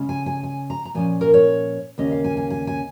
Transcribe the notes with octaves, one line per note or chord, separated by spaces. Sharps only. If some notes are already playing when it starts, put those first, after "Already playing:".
Already playing: C#3 G#3 C#4
G#5
G#5
G#5
A#5
A#5
A#2 F3 C#4 G#5
A#4
C#5
D#2 C#3 A#3 C#4 D#5
F5
G#5
G#5
G#5
G#5